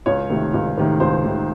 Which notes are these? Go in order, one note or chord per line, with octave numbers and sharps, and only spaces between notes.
C#2 C#5
C3 D#3 A3
C#2
C3 D#3 A3
C#2 C5
C3 D#3 A3